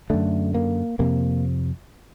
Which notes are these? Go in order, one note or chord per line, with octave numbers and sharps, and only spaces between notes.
F#2 D3 A3
A#3
F2 C3 A#3